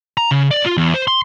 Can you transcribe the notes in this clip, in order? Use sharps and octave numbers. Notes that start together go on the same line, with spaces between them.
A#5
C#3
D5
F4
E2
C5
C6